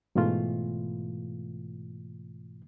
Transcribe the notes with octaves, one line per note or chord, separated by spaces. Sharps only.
G#2 B2 E3 A3 F4